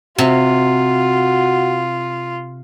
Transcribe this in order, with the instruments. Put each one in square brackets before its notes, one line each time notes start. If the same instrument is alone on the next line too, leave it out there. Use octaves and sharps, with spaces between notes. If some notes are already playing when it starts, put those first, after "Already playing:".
[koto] C3 [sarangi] F4 [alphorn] F#4